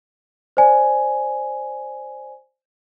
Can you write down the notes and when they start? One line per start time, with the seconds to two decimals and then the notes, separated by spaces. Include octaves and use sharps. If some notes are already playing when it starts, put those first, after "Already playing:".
0.57 C5 D5 G#5